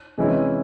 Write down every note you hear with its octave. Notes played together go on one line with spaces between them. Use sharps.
C3 E3 G#3 C#4 E4